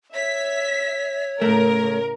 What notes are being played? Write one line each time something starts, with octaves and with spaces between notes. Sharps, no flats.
C#5 E5 B6
A2 C#3 A3 A#4